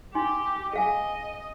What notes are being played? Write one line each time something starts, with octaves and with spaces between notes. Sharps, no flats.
D#4 G4 G#5 C6
G#4 D#5 F5 G#5